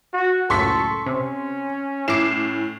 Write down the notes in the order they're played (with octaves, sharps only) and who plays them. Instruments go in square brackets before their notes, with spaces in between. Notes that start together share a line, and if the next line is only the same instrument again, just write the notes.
[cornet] F#4
[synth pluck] C#2 F#2 A2 [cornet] A4 [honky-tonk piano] C6 C#6 B6
[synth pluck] C3 [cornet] C#4
[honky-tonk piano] A2 C7 E7 [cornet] C#4 [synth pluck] E4 D6